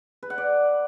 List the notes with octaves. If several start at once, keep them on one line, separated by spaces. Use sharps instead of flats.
B4
F#5
D5